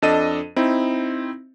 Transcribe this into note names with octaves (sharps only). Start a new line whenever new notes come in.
F2 D4 A4 D#5 D#7
C4 D#4 E4